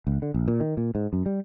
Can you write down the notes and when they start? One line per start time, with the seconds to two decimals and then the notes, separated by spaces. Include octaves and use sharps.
0.07 C#2
0.22 D3
0.34 A#1
0.48 A#2
0.60 D#3
0.77 A#2
0.95 G#2
1.13 F#2
1.26 G3